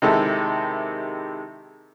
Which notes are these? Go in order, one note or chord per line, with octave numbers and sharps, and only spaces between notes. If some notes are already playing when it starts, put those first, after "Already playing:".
C3 D#3 G#3 E4 A4